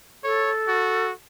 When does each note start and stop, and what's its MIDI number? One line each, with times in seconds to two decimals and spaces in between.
0.24 1.06 69
0.24 0.51 73
0.68 1.12 66